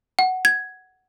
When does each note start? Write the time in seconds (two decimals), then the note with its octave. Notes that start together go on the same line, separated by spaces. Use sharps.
0.19 F#5
0.45 G#6